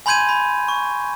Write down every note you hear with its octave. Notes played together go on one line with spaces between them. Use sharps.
G#5 B5 C6 G6 G#6 D#7
B5
C#6